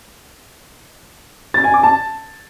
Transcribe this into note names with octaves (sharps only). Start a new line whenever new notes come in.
A6
G#5
D6
A5